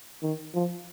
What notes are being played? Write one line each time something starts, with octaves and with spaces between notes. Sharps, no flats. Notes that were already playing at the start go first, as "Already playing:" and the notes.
D#3
F3